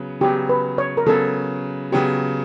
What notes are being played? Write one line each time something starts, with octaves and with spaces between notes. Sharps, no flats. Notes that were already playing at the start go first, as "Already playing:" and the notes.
Already playing: C#3 F#3 B3
C#3 F#3 B3 G4
B4
C#5
A#4
C#3 F#3 B3 A4
C#3 F#3 B3 G4